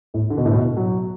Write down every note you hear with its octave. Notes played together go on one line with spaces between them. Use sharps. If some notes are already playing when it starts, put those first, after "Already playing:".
A2
D3
B2
A2
B2
F#3